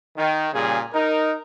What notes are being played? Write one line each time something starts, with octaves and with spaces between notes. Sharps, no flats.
D#3
A#2 C#3 G3 G#4
D#4 A#4